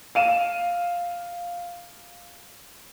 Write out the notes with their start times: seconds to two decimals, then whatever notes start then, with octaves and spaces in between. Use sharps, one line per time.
0.15 F5 D#7 E7